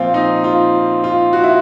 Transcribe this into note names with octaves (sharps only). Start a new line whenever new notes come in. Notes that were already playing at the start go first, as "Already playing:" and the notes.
Already playing: A#2 F3 C4 F4
D#4
F4
F4
F#4
E4